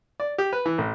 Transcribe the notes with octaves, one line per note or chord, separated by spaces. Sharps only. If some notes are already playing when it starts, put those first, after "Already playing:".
D5
G4
B4
E3
A1